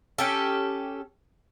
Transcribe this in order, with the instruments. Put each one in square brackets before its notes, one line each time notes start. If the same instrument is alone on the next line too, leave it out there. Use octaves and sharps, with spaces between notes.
[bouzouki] C#4 G4 A4